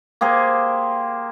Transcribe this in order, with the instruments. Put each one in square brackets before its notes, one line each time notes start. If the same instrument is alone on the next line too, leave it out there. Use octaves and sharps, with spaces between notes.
[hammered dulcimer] A#3 G4 G#4 C5